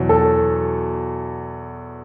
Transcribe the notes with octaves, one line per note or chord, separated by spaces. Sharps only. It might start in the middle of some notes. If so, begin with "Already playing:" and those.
Already playing: E2 B2 F#3
A4